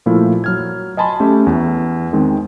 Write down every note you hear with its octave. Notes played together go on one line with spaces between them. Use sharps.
A#2 F3 A3 E4 F4
F#3 F6 G#6
D#5 G#5 A5 B5 C6
A3 C#4 G4
E2
D#3 G#3 C4